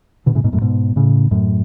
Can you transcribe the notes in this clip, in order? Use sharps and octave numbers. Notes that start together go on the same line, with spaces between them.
B2 D3
A2 C#3
G#2 B2
F#2 A2
G#2 B2
A2 C#3
F#2 A2